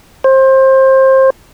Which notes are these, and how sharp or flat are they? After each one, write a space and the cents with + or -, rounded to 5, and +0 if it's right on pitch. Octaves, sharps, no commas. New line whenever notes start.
C5 +25